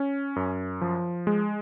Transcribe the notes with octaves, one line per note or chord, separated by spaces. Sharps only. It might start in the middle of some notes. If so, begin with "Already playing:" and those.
Already playing: C#4
F#2
F3
G#3